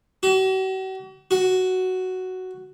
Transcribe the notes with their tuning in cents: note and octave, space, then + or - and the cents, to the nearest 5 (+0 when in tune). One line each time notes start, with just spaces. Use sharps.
F#4 +45
F#4 +5